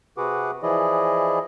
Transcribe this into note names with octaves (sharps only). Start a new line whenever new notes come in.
C3 F#4 G#4 B4 F#5 D6
E3 F3 E4 G#4 D5 D#5